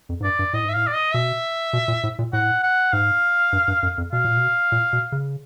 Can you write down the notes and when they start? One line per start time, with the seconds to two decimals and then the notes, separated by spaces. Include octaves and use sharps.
0.09 F2
0.20 G#2
0.24 G2 D5
0.39 G2
0.53 A2 D#5
0.64 G#2 E5
0.74 A2 F5
0.87 D5
0.94 D#5
1.14 B2 E5
1.73 B2
1.88 A#2
2.03 A2
2.19 A#2
2.33 A2 F#5
2.63 F#5
2.93 G#2 F5
3.53 G2
3.68 G2
3.83 F#2
3.98 F2
4.12 B2 F5
4.25 A#2
4.37 B2
4.72 A#2
4.93 B2
5.12 C#3